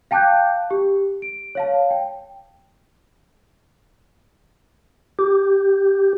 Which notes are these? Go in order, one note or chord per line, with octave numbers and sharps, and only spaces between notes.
F5 G5 A5 D6 F#6 G6
G4
D7
C#5 F5 A5
G5
G4